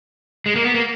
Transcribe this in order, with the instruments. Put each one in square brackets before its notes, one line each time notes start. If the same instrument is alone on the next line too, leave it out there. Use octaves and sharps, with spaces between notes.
[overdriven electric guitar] G#3
A#3
B3
A#3